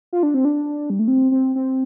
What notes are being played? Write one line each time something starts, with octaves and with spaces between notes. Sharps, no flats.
F4
D4
C4
D4
G3
A3
C4
C4
C4